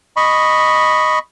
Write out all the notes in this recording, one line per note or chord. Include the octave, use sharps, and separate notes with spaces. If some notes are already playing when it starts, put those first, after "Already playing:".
D#5 B5 C#6